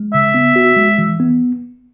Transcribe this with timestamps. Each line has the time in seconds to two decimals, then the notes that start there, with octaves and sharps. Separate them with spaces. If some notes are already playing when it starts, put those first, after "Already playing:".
Already playing: G#3
0.13 C#3 E5
0.34 B3
0.56 F#4
0.77 G#3
0.99 E3
1.20 B3